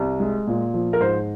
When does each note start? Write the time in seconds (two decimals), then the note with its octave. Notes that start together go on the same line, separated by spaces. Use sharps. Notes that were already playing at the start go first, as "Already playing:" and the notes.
Already playing: C2
0.20 G#3
0.47 A#2
0.74 F3
0.93 A#4
1.00 G#2 C5